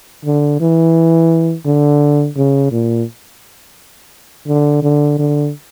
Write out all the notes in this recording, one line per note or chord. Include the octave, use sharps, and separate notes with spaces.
D3
E3
D3
C#3
A#2
D3
D3
D3